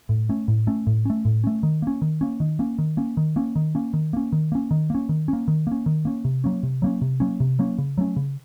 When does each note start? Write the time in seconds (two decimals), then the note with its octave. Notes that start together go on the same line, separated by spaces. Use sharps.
0.09 A2
0.29 A3 C#4
0.48 A2
0.67 A3 C#4
0.87 A2
1.05 A3 C#4
1.25 A2
1.44 A3 C#4
1.63 D#3
1.82 A#3 C#4
2.02 D#3
2.21 A#3 C#4
2.40 D#3
2.59 A#3 C#4
2.78 D#3
2.97 A#3 C#4
3.17 D#3
3.36 A#3 C#4
3.56 D#3
3.75 A#3 C#4
3.93 D#3
4.13 A#3 C#4
4.32 D#3
4.52 A#3 C#4
4.71 D#3
4.90 A#3 C#4
5.09 D#3
5.28 A#3 C#4
5.48 D#3
5.67 A#3 C#4
5.86 D#3
6.05 A#3 C#4
6.25 C3
6.44 F#3 A#3 C#4
6.63 C3
6.82 F#3 A#3 C#4
7.02 C3
7.20 F#3 A#3 C#4
7.40 C3
7.59 F#3 A#3 C#4
7.78 C#3
7.98 F#3 A3 C#4
8.16 C#3